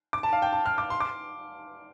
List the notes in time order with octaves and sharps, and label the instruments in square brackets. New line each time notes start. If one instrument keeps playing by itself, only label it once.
[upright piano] D6
A5
F5
G5
A5
F6
D6
C6
D6